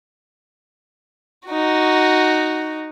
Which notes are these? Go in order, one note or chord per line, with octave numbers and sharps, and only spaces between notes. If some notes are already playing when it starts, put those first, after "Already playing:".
D#4 F#4